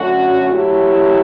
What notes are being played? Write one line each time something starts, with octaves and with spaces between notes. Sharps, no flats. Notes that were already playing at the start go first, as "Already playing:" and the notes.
Already playing: F#2 D3 A3 C#4 F#4
A2 F#3 A3 E4 G4